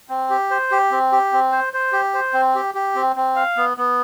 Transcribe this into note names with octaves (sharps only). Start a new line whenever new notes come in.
C4
G4
C5
G4
C4
G4
C4
C5
C5
G4
C5
C4
G4
G4
C4
C4
F5
B3
B3